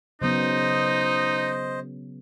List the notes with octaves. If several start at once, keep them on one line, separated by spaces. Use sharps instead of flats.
C#3 F#3 B3 D#4 C5 D#5